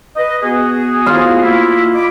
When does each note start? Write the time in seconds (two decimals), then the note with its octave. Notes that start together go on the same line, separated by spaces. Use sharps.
0.16 B4 D#5
0.42 B3 F#4 G#4
1.06 F4 F5
1.42 A#3 E4
1.94 D#5 B5 D6